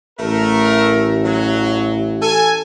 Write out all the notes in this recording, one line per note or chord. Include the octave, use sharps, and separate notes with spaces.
A1 A3 A#4
F#3
A4 G#5